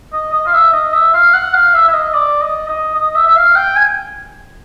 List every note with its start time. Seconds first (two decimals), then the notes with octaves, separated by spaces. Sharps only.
0.13 D#5
0.33 D#5
0.46 F5
0.54 E5
0.73 D#5
0.93 E5
1.14 F5
1.34 F#5
1.54 F5
1.74 E5
1.88 E5
1.94 D#5
2.14 D5
2.42 D#5
2.69 D#5
2.95 D#5
3.15 E5
3.27 E5
3.36 F5
3.56 G5
3.77 G#5